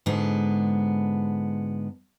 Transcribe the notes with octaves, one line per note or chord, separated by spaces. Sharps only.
G#2 D3 G#3 B3 F4